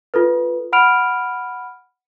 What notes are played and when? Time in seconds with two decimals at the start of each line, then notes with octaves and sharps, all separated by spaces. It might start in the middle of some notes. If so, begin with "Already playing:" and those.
0.14 F4 A4 B4
0.73 F#5 B5 F6 D7 F7